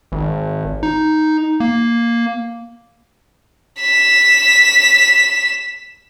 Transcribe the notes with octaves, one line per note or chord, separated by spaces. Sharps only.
G#1
D#4
A#3
B6 E7